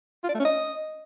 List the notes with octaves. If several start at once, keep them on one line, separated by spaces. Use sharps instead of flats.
F4
D5
A3
C#4
D#5